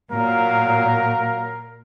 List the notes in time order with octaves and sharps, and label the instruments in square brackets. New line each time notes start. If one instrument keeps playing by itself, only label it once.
[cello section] A#2 [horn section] F#3 F5 [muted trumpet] A#4